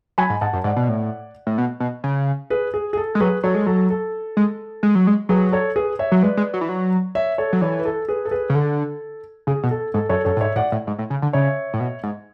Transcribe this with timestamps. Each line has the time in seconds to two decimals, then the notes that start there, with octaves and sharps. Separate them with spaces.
0.18 F#3 G#5 B5
0.30 G#2
0.41 G#2 F#5 A5
0.53 F#2
0.64 G#2 D5 F#5
0.76 B2
0.89 A2
1.47 A2
1.58 B2
1.80 B2
2.04 C#3
2.50 G#4 B4
2.74 G#4
2.93 G#4
2.97 A4
3.15 G#3
3.20 F#3 G#4 B4
3.43 F#3 A4 C#5
3.55 G#3
3.67 F#3 A4
3.90 A4
4.37 G#3
4.83 G#3
4.95 F#3
5.07 G#3
5.29 F#3 G#4 B4
5.52 A4 C#5
5.76 G#4 B4
5.99 C#5 E5
6.12 F#3
6.22 G#3 B4 D5
6.37 G#3
6.54 F#3
6.61 E3
6.69 F#3
7.15 C#5 E5
7.38 A4 C#5
7.53 F#3
7.61 E3 A4 C#5
7.79 B4
7.85 A4
8.08 G#4 B4
8.25 A4
8.31 G#4 B4
8.49 C#3
8.55 D3 A4
9.47 C#3 G#4
9.63 B2
9.71 A4
9.94 G#2 A4
10.09 F#2 A4 C#5
10.25 F#2 A4 C#5
10.37 A2
10.40 G#2 C#5 E5
10.55 A2 D5 F#5
10.72 A2
10.87 G#2
10.99 A2
11.10 C#3
11.22 D3
11.33 C#3 C#5 E5
11.74 A2
11.80 B2
12.03 G#2